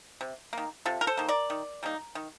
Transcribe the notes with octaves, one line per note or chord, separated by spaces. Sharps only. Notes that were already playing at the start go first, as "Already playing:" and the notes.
C3
D#3 A#3
C3 F4 A4
A#4
A4 C5
D#3 A#3
A#4 D5
D#3
G3 A#3 D#4
D#3